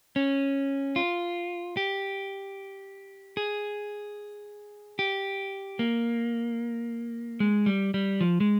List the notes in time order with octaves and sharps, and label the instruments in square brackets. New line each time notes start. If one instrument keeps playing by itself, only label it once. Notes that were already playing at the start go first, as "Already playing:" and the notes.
[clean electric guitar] C#4
F4
G4
G#4
G4
A#3
G#3
G3
G3
F3
G#3